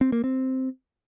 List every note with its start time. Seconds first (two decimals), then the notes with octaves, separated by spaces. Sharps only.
0.01 C4
0.12 A#3
0.24 C4